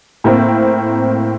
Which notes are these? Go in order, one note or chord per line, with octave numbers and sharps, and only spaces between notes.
A2 A#3 C4